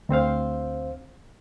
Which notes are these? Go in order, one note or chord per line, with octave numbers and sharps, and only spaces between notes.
D2 C4 C5 F5